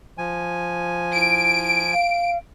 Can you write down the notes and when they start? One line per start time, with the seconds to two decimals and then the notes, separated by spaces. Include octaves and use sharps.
0.18 F3 G#5
1.15 E4 D7
1.93 F5